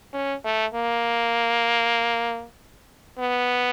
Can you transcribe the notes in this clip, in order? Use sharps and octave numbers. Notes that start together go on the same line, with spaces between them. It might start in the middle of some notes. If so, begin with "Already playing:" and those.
C#4
A3
A#3
B3